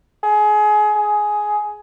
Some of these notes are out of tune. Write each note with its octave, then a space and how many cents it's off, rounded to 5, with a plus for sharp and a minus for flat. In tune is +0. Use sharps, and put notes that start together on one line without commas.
G#4 +25
G#4 +10